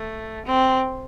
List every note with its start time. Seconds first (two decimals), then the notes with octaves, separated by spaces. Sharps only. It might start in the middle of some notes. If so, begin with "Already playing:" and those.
Already playing: A3
0.46 C4